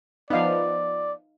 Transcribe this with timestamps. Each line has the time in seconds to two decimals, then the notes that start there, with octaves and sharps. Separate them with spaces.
0.30 F3 B3 D#4 D5 F5